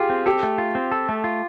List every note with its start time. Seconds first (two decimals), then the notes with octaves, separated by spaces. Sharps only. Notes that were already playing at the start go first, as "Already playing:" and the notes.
Already playing: F4 G4 G#4
0.10 C4
0.26 G4 A4
0.43 A3
0.58 F4
0.75 C4
0.92 A4
1.09 A3
1.24 F4